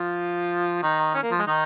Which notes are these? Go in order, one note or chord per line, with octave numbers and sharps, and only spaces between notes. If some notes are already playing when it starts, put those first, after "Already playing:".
Already playing: F3 F4
D#3 D#4
C#4
A#3
F3
G#3
D#3 D#4